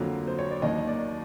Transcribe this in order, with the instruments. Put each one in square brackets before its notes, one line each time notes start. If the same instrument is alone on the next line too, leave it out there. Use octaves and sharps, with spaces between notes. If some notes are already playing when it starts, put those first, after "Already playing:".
Already playing: [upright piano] F2 D3 F#3 A#3
C5
C#5
D5
D#2 D#3 F#3 A#3 D#5
D5